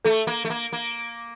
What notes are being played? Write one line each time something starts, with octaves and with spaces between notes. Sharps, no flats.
A3 A4
A#3
A3
A#3
A#3